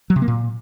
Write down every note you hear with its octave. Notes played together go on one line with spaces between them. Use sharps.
F#3
C3
A#3
A#2